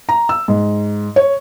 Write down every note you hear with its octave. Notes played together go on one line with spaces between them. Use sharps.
A#5
E6
G#2
C#5